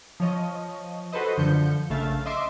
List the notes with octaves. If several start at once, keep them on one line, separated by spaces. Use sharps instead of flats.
F3 C#5 D#5
F#4 A4 B4 C5 D#5
F#2 D3 F3 G6 C#7
A#1 C#3 A3 E5 F5 A6
D#5 E5 C6 D6